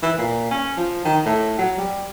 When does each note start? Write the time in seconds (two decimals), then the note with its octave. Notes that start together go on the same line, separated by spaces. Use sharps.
0.03 E3
0.18 A#2
0.51 C#4
0.77 F3
1.05 D#3
1.25 A2
1.58 F#3
1.78 G3